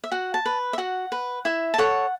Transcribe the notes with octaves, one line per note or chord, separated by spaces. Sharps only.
E5
F#4 F#5
A5
B4
E5
F#4 F#5
B4
E4 E5
A5
A4 C#5 F#5